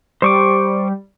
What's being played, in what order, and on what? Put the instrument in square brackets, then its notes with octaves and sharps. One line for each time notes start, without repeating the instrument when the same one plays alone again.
[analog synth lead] G3 [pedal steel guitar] C5 C#6 D6